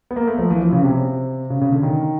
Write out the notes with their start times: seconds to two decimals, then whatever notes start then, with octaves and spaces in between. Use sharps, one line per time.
0.11 B3
0.16 A#3
0.27 A3
0.38 F3
0.50 E3
0.61 F3
0.72 C#3
0.83 C3
1.50 C#3
1.61 C#3
1.72 D3
1.83 D#3